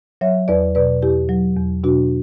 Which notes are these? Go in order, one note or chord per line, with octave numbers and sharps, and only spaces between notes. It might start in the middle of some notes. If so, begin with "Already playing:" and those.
F#3 C#5 E5
E2 B4 D5
B2 B4 D5
E2 E4 G4
F#3
E2
B2 D4 F#4